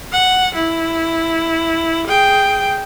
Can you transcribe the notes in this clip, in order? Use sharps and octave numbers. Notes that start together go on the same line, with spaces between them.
F#5
E4
G#4 G5